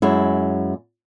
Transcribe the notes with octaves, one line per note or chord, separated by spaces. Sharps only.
F#2 G#3 E4